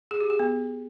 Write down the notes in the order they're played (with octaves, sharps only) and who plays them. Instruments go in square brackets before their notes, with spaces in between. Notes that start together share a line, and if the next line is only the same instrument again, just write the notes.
[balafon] G#4
G4
G#4
B3